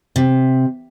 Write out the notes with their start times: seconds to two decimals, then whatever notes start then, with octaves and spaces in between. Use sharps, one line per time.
0.16 C3